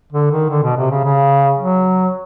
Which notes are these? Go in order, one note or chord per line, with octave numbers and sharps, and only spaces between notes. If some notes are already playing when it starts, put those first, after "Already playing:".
D3
D#3
D3
B2
C3
C#3
C#3
F#3